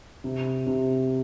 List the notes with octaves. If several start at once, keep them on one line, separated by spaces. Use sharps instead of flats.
C3
C3